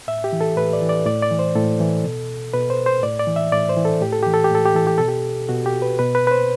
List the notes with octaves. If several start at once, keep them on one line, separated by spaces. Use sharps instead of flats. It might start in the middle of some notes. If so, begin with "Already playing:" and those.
A2 E5
G4
E3
A4
A2 B4
D5
E3
D5
A2 D5
D5
E3
C5
A2 A4
E3
B2
B2 B4
C5
C5
A2 D5
D5
E3
E5
A2 D5
C5
E3
A4
A2 G4
A4
E3 G4
A4
G4
A2 A4
G4
E3 A4
G4
B2 A4
G4
B2 F#4
G4
B4
B2 B4
B4
B4
C5